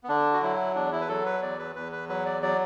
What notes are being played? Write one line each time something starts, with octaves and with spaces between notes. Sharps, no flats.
B3
D3 D4
F#4
F#3 E4
E2 D4
E4
B4
F#3 A4
B4
E2 D5
B4
E2 B4
B4
F#3 B4
D5
F#3 D5